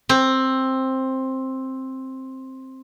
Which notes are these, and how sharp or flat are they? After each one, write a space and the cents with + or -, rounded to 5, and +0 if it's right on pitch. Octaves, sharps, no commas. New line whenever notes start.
C4 +10